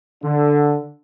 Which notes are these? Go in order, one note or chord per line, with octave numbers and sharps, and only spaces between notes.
D3